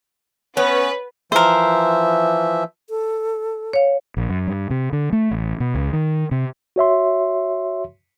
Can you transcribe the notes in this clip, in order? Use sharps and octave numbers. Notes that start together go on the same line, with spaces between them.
B3 C#4 B4 C#5
E3 F3 A#4 C5 E5
A4
C#5 F5
A#1
F#2
G2
C3
D3
A3
A1
B2
C#2
D#3
C3
F#4 C#5 E5 C6